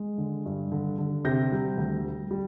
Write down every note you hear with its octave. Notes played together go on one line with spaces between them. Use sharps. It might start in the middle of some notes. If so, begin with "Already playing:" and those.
Already playing: G#3
D3
G2
D3
D3
C3 G6 A#6
G3
D2
G3
G3